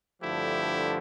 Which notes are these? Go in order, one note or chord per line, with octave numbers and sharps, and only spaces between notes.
G2 D3 F3 A3 E4 G4